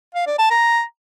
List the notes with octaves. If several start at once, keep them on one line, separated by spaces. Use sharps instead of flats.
F5
D5
A5
A#5